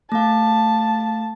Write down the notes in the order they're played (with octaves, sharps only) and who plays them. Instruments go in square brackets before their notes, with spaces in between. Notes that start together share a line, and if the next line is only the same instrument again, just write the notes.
[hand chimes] A3 F5 [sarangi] A5